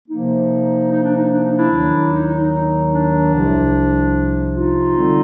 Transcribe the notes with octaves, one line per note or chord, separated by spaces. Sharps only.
C3 F3 A#3 D#4
D#4
D4
D#4
D4
D#4
D4 E4
D#2 D#3 F#3
D#4
D#4
D#4
D#4
D4
C2 C3 F3
D#4 F4
D3 G3 C4